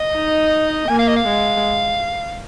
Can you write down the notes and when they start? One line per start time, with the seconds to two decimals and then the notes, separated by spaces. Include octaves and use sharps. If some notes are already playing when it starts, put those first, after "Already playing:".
Already playing: D#5
0.15 D#4
0.89 A#3 G#5
0.99 F5
1.08 D#5
1.17 F5
1.27 G#3